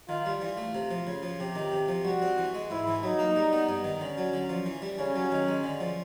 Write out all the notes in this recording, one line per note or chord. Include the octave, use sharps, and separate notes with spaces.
D#3 F4
G3
E3 F4
A3
C3
F3
C#3
F3
C3 G4
D#3
C3
F3
G3 F#4
C4
E3
G#3
G#2 E4
E3
F#3 D#4
A#3
G3
B3
G2
D#3
D3 C#4
F#3
D3
F3
E3
G3
C#3 C#4
F#3
D#3
G#3
D3
F3